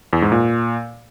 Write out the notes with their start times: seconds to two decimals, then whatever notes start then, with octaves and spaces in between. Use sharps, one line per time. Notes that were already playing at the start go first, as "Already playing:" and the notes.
0.13 E2
0.22 G#2
0.32 A#2